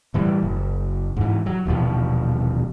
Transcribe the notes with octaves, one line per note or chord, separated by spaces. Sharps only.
A2 E3 G3
F#1
G#2 E3
F#3
D#1 A1 B2 F3